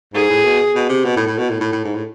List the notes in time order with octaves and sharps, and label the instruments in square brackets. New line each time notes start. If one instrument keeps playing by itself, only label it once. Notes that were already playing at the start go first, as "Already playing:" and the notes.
[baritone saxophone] G#2 [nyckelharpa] G#4
[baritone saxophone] A2
B2
B2
C3
B2
A2
A2
B2
A2
A2
A2
G#2
A2